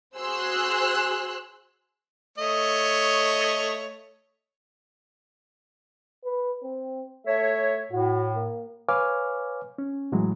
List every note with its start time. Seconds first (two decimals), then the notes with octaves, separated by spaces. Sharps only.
0.16 F#4 G#4 C5 C6 E6 F#6
2.38 A3 C#5 D#5
6.24 B4
6.63 C4
7.27 A3 C#5 E5
7.92 A2 F#4
8.35 A#3
8.89 B4 C#5 F5 G#5 D6 F6
9.78 C#4
10.12 A2 E3 F#3 G#3